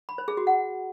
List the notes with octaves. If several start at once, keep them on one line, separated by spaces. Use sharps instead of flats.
B5
C5
G#4
F#4
F#5